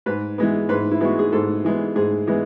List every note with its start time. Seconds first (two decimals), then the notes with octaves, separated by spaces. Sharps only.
0.06 G#2 B4
0.38 E3 G#3 B3
0.69 G#2 B4
0.91 E4
1.01 E3 G#3 B3 F#4
1.19 G#4
1.32 G#2 A4
1.64 E3 G#3 B3
1.96 G#2 G#4
2.27 E3 G#3 B3